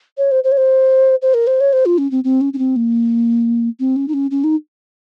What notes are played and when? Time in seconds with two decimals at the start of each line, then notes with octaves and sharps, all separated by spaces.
0.18 C#5
0.31 C5
0.44 C5
0.52 C#5
0.57 C5
1.22 C5
1.34 A#4
1.47 C5
1.60 C#5
1.73 C5
1.86 F4
1.98 C#4
2.11 C4
2.24 C4
2.41 C#4
2.53 C#4
2.58 C4
2.76 A#3
3.80 C4
3.96 C#4
4.08 D#4
4.14 C#4
4.31 C#4
4.44 D#4